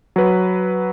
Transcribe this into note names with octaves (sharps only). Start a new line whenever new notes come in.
F#3 B4